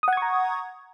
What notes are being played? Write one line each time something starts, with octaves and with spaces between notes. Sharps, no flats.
F#5 A#5 C#6 D#6 G#6